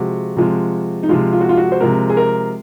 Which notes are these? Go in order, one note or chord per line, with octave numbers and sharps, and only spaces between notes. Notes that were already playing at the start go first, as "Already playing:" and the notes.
Already playing: C3 F3 G#3 F#4
C3 F3 G#3
D#4
C3 F3 G#3 F4
F4
F#4
F4
F#4
C5
C3 F3 G#3 A#4
G#4
A#4